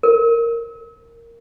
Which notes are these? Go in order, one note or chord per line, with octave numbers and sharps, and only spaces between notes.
A#4